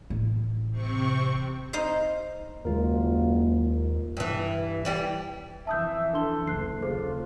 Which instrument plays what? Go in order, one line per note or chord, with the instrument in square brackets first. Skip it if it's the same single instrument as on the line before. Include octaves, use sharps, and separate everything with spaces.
[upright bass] A1
[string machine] C3 C4 C#6
[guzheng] D#4 C5 D#5 F5
[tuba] F#1 [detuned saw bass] D#2 [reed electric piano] G#3 F4 A#4 [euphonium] A#3
[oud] G2 E3
E3 G3 G4
[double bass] F2 E3 [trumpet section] E5 [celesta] A5 D#6 G6
[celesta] D4 C6 G7 [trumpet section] A4
[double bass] F#1 D2 [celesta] F#6 C7
[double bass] D#2 C#3 [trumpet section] F4 [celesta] G#4 A4 C5